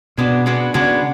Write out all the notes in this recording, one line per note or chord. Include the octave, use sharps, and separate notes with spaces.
B2 G#3 B3 D4 F#4
G#3 B3 D4 F#4
C#3 G#3 B3 D4 F#4